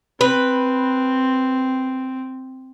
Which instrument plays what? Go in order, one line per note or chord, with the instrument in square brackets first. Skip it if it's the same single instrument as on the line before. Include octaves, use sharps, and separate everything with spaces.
[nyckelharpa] C4 [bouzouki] B4